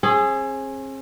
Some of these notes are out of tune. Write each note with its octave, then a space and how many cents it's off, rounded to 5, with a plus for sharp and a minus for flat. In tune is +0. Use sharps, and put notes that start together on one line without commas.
C4 +45 G#4 +0